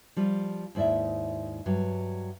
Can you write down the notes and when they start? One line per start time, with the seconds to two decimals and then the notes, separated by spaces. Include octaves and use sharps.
0.16 F3 G3 F4
0.75 D#2 G#2 E4 D5 E5
1.66 G2 F#3